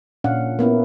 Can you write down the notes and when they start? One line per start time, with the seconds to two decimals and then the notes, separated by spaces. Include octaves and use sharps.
0.24 A#2 C#4 D4 F5 F#5
0.59 A#3 B3 C#4 E4